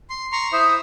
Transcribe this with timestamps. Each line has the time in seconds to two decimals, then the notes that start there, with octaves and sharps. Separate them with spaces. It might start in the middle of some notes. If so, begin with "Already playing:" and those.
0.10 C6
0.32 A#5 C6 C#6
0.53 E4 C5 E5 D#6